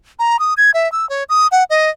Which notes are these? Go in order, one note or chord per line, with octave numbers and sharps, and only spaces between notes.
A#5
D#6
G#6
E5
E6
C#5
D#6
F#5
D#5